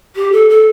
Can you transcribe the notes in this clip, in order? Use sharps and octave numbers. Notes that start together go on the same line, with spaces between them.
G4
A4
A4